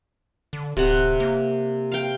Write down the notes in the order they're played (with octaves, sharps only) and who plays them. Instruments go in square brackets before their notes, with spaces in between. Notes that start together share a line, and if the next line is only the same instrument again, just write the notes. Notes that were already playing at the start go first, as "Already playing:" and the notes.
[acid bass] D3
[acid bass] D1 [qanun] C3 F#5
[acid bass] A#3
[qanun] F5 G5